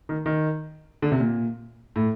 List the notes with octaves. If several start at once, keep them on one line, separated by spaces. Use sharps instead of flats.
D#3
D#3
D3
C3
A#2
A2